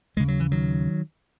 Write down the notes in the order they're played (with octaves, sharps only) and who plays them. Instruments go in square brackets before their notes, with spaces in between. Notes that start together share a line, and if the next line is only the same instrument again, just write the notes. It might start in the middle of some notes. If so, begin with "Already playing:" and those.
[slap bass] D#2 C#3 G#3
F#3
E3
D#3 F#3